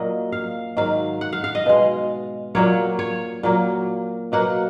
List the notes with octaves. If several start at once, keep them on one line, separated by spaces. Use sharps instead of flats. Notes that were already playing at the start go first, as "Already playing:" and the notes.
Already playing: A#2 F#3 A#3 D#5
F5
G#2 D#3 F#3 F5
F#5
F5
F5
D#5
B2 G#3
A#2 F#3 A#3 C#5
C#5
A#2 F#3 A#3
B2 F#3 A#3 F#5